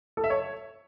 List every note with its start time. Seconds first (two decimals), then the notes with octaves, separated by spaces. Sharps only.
0.17 A4
0.24 E5
0.30 C#5